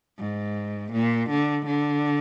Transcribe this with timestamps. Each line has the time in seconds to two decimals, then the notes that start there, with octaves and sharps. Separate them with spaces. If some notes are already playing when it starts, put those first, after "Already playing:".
0.19 G#2
0.93 A#2
1.30 D3
1.66 D3